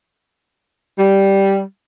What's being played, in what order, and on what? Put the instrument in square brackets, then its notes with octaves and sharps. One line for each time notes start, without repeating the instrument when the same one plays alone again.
[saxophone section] G3